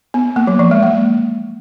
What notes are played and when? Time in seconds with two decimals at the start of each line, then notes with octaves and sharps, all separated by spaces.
0.14 B3
0.36 A#3
0.47 F#3
0.59 F3
0.71 G#3
0.83 A#3